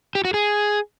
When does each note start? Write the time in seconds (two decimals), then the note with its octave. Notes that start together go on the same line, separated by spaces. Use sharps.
0.15 G4
0.25 F#4
0.34 G#4